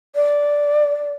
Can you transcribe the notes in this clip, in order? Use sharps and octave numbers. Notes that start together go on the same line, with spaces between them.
D5